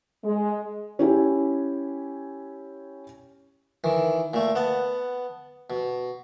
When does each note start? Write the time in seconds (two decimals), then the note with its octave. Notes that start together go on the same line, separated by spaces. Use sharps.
0.24 G#3
0.99 C#4 E4 G4 G#5
3.84 D#3 E3
4.34 A#2 A3
4.55 B3 F#5 A5
5.70 B2